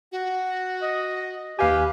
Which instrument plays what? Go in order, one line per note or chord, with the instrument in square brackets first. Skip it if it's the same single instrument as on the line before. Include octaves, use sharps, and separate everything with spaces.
[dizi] F#4
[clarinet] D#5
[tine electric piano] D#2 F5 G#5 [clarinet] G4 [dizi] B4